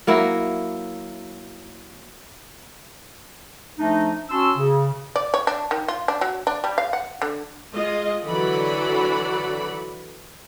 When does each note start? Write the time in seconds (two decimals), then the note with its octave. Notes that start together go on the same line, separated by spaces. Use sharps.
0.07 F#3 A#3 E4
3.79 F3 A3 D4 D#4
4.30 C#4 F#4 A5 C6 E6
4.56 C#3
5.16 D5
5.34 C#5
5.47 D4
5.71 D#3
5.88 F4
6.08 D4
6.21 F#3
6.47 D4
6.64 G3
6.78 F5
6.93 F#5
7.22 D3
7.73 G#3 F4 D#5
8.26 D3 E3 F#3 D5 F#5 B5